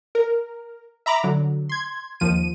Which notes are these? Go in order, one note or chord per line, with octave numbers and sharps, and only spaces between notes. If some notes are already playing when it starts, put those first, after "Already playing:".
A#4
E5 A#5 B5 D6
D3 F#3
C6 G#6
D#2 F3 D#7